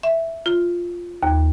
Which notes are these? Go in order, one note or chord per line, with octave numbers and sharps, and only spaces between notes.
E5
F4
D#2